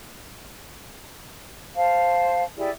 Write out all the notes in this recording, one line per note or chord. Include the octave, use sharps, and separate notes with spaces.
C5 F5 A5
E4 G4 G#4 D5